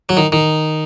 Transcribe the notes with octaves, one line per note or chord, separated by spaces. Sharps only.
F#3
D#3
D#3